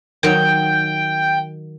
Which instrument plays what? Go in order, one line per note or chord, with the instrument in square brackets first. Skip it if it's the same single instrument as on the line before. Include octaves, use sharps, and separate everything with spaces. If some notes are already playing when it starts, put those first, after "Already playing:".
[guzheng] D#3 F#3 [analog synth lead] G5